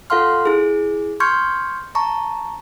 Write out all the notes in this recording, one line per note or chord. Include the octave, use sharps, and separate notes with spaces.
F4 A4 F5 F#5 C6 F6
E4 G#4
C6 C#6 F6 G6 G#6 C#7
A5 A#5 C#6